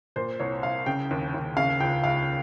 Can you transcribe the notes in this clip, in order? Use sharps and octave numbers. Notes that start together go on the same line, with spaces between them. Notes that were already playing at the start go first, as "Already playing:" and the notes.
A#2 C5
C2 C#5
C2 F5
C#3 G5
D#2
D#2
C#3 F5
C#2 G5
C#2 F5